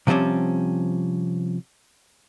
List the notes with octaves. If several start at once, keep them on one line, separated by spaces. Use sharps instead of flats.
C3 F3 G3 C4 C#4